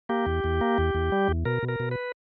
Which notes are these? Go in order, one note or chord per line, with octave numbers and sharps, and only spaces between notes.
A#3 G4
E2
E2
A#3
E2
E2
G3
E2
B2 A#4
B2
A#4
B2
B4